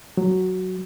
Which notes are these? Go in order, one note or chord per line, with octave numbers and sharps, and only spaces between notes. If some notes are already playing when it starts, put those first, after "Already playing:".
F#3